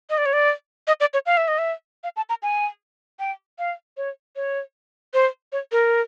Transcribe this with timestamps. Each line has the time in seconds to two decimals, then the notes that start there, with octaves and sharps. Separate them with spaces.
0.10 D#5
0.18 D5
0.26 C#5
0.33 D5
0.87 D#5
1.00 D5
1.14 C#5
1.26 F5
1.37 E5
1.48 D#5
1.58 E5
2.04 F5
2.16 A5
2.29 A#5
2.43 G#5
3.19 G5
3.59 F5
3.97 C#5
4.36 C#5
5.14 C5
5.52 C#5
5.72 A#4